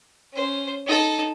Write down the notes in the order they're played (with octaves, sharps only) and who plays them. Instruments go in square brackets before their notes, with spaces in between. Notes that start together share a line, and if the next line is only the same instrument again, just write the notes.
[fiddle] C#4 C5
D#4 A4